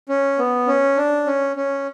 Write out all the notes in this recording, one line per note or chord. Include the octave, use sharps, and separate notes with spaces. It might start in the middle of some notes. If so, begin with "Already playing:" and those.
C#4
B3
C#4
D4
C#4
C#4